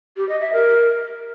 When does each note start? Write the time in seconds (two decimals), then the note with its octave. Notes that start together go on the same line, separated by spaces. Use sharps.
0.17 G4
0.29 D#5
0.41 E5
0.53 A#4